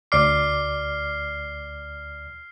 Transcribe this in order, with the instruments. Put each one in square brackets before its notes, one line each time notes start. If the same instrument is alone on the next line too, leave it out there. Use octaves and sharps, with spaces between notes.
[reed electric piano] D2 D5 D6 [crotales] F6 C7